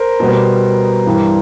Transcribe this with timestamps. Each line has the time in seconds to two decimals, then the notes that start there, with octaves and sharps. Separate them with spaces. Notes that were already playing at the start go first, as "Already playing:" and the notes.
Already playing: A#4 C5
0.20 B2 G3 B3
1.06 G2 E3 G3